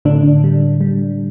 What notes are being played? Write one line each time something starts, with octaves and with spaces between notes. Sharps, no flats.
A2 D3 D4
G3
G3